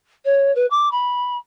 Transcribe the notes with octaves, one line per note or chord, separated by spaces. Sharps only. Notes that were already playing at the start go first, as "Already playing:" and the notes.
C#5
B4
D6
B5